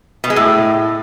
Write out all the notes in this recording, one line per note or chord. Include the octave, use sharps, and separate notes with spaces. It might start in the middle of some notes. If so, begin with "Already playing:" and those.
B2
G#3
A2